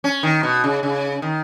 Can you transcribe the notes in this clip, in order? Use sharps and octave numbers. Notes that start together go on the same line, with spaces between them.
C#4
D#3
B2
C#3
C#3
D#3